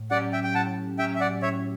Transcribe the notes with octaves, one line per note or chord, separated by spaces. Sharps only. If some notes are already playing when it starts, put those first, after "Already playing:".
Already playing: A2
F#3 C#4 G4 D5 F#5
E5 G5
G5
A2 F#5 A5
F#3 C#4 G4 E5 G5
E5
D5 F#5
A2 C#5 E5